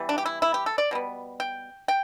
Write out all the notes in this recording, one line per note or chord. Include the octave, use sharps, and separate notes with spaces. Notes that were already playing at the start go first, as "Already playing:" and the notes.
Already playing: E3 G3 B3
D4
G4
E4
E4
G4
A4
D5
B2 G3 B3
G5
G5